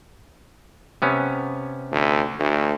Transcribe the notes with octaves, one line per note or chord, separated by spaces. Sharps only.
C3 B3 C#4
D2
D2